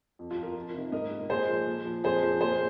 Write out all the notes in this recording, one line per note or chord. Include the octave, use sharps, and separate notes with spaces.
F2
F4
F3
F4 A#4
F2
C3 D#3
G#2 A#4 D#5
D#3
A#2 G#4 C5
F3
A#2
F3
F2 G#4 C5
F3
A#2 G#4 C5